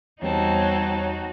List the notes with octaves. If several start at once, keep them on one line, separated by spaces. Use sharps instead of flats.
E2 G3 B3 C4 D#4 F#4 C#5 A5